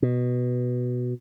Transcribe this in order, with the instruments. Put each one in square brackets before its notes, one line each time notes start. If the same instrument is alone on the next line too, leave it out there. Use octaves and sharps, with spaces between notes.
[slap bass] B2